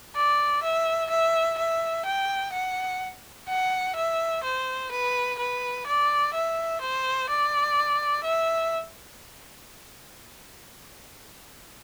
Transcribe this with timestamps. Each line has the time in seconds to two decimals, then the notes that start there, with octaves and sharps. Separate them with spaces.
0.16 D5
0.63 E5
1.10 E5
1.58 E5
2.06 G5
2.53 F#5
3.49 F#5
3.96 E5
4.43 C5
4.91 B4
5.39 B4
5.86 D5
6.34 E5
6.81 C5
7.30 D5
8.24 E5